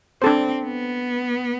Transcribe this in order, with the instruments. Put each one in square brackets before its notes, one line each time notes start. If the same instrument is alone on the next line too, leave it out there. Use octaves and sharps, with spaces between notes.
[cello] C4 [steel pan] D4 A4 C5
[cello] B3